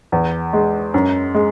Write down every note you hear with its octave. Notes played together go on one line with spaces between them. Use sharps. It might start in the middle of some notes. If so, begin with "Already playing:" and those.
E2
G#3
F#2
G#3